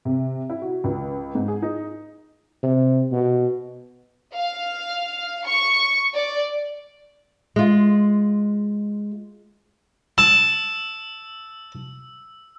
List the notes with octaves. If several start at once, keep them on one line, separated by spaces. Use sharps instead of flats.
C3
E4
F#4
C#2
G#2
G#4
D#4
C3
B2
F5
C#6
D5
G#3 F4
A5 E6